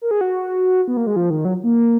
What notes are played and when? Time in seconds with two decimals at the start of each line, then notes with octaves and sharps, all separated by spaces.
0.02 A#4
0.11 G#4
0.21 F#4
0.88 B3
0.97 A#3
1.07 G#3
1.16 F3
1.30 D#3
1.45 F#3
1.64 A#3